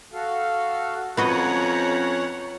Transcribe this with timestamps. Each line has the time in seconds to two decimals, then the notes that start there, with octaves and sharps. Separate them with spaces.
0.13 F#4 A4 F5
1.17 F2 B3 C#4 F#4 C#5 D#5 F#5 A#5